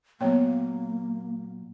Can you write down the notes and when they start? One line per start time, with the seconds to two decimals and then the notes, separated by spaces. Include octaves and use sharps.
0.21 A#2 F#3 A#3 B3 C#5 G5